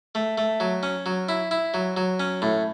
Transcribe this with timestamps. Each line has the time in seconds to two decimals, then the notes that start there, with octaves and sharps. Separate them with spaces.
0.15 A3
0.38 A3
0.60 F#3
0.83 C#4
1.06 F#3
1.29 E4
1.51 E4
1.74 F#3
1.97 F#3
2.20 C#4
2.42 A2